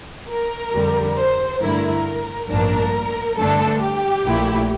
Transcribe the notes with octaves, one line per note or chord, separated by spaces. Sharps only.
A#4
F2 D3 G3
C5
G2 D3 A3 E4 A#4
A1 G2 F3 A#3 D4 A#4
G2 D3 A3 D4 A4
G4
A#1 A#2 A3 E4